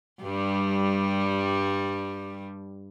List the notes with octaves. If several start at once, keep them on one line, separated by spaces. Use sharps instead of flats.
G2 G3